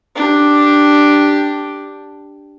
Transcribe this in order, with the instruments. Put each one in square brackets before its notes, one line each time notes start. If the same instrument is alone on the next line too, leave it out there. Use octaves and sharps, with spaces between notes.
[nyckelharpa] D4 G4